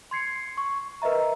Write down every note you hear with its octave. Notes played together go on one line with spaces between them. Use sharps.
C6 G#6 C7 C#7
C#6
A#4 B4 D#5 E5 A#5